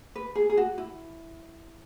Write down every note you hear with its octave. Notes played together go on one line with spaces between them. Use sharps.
B4
G#4
G#4
F#4
E4